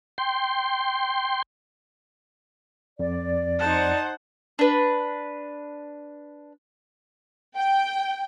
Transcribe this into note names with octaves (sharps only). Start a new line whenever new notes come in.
G5 C6
F2 D5
D#4 C5 F#5 A5
D4 B4
G5